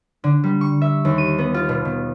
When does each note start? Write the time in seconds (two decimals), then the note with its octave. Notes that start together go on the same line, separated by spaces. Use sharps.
0.24 D3
0.44 G3
0.61 C#6
0.81 E5
1.05 D#2
1.18 D#7
1.38 B3
1.54 F4
1.69 B2
1.85 B2